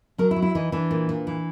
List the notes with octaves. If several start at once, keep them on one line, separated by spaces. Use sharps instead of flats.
F#3 A#4
E4
F#3
E4
E3 D#4
E3 D4
A#2
A#2
E3